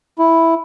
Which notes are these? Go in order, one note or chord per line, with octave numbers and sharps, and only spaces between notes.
E4